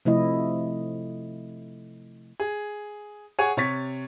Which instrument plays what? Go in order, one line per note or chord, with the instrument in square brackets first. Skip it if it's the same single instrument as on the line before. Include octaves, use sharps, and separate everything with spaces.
[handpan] C3 F3 A3 E4 D#5
[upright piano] G#4
G#4 C#5 F#5 G#5
C3 C#5 A6 B6